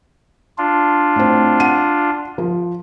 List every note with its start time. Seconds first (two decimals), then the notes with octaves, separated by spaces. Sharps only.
0.58 D4 F4
1.16 A2 C4
1.60 F#5 D#7
2.38 F3